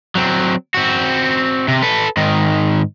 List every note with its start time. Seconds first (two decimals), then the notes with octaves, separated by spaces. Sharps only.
0.15 F#3 C4
0.74 C4 F#4
1.68 C3
1.82 A4 B4
2.17 G#2 D#3